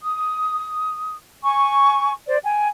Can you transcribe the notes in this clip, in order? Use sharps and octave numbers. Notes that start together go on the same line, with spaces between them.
D#6
G#5 C#6
C5 D5
G5 G#5